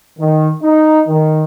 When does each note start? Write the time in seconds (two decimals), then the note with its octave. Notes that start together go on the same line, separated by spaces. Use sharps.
0.19 D#3
0.63 D#4
1.08 D#3